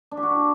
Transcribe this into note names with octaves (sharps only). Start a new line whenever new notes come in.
D4
G4
F#4